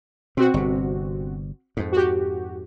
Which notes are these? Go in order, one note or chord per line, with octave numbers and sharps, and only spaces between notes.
B2 C4 F#4
G1 C3
F2 G#2
F#4 G4